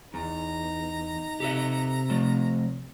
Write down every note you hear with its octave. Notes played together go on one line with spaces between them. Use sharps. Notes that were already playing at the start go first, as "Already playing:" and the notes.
E2 D#4 A#5
C3 G4 A4 E5
F3 A3